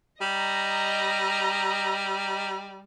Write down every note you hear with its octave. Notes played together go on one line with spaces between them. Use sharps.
G3 D#5 A#5